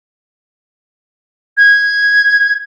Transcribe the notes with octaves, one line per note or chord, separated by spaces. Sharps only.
G#6